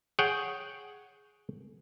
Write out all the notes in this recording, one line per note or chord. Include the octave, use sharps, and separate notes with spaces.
G#4 C#5 F#5 G5